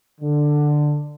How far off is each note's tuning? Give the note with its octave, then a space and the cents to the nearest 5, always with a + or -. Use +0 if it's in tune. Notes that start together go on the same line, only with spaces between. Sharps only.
D3 +10